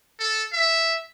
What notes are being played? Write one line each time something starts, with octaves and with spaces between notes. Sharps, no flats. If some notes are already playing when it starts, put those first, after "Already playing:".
A4
E5